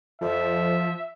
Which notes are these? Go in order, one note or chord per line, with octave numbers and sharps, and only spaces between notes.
F2 F3 E5